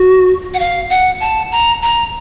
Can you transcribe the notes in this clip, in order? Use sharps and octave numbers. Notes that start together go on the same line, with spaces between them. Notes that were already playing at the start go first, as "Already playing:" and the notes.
Already playing: F#4
F#5
F5
F#5
A5
A#5
A#5